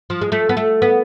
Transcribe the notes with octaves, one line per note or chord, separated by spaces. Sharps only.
F3
G#3
A3
B3
A3
B3